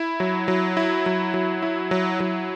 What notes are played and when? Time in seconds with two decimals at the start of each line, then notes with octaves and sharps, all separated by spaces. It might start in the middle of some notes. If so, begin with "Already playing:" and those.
Already playing: E4
0.20 F#3
0.48 F#3
0.77 E4
1.06 F#3
1.34 F#3
1.62 E4
1.91 F#3
2.20 F#3